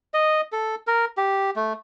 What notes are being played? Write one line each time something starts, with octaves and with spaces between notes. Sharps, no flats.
D#5
A4
A#4
G4
A3